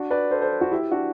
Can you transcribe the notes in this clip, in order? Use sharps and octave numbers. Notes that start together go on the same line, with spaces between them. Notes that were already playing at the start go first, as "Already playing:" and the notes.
Already playing: D4 F#4
B4 D5
A4 C5
A4 C5
F#4 A4
E4 G4
D4 F#4